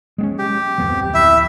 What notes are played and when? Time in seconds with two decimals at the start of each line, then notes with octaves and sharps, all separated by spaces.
0.18 G#3 B3 C#4
0.39 G4
0.78 D1 F2 B3
1.15 E4 E5